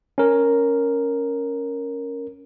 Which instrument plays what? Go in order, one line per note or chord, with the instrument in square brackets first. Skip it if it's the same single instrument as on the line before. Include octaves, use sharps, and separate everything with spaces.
[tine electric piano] C#4 A#4